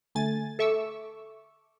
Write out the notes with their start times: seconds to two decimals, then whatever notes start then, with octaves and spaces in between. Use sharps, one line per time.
0.15 D2 A3 G#5 A6
0.59 A4 E5 C#6 D6 E6